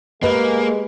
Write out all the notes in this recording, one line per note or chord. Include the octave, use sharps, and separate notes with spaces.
G#3 A#3 G4 B4 D#5